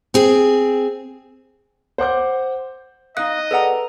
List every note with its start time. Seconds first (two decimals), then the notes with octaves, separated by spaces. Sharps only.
0.14 C4 G#4
1.98 C5 F#5 D6 G6
3.17 D#4 D#5 F5 D#6 F#6
3.51 G#4 A4 B4 D5 F#5 A#5